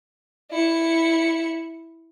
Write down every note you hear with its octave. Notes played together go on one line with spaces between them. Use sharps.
E4 C#7